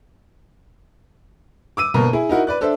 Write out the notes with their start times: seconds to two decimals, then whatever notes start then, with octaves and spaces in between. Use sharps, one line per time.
1.77 D6 E6 D#7
1.94 G1 B2 A#3 A#5
2.13 E4 G#4
2.29 D#4 E4 F#4 A#4
2.47 B4 D5 F#6
2.61 D4 A4 C5 E5